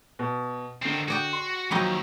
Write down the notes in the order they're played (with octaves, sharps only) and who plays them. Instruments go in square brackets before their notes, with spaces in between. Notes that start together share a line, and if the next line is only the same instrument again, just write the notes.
[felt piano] B2
[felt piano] D3 C7 [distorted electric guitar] D#3 C4
[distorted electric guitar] F#4 [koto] G#4 D5 G5
[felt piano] C6
[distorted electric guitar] D#2 [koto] F3 C4 D#5 [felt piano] F#3 A#5 C#6